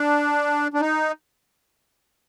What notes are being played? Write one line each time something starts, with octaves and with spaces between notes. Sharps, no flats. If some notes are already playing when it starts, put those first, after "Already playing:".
Already playing: D4
D4
D#4